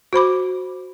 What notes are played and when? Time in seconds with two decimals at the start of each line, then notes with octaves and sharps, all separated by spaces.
0.13 F#4 C5 B5 D6